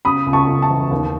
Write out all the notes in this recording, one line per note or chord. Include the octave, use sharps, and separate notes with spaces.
C#3 B5 D#6
C#2
A5 C#6
C#2
A5 C#6
E3
D#2